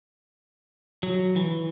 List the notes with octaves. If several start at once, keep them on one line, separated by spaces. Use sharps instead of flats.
F#3
E3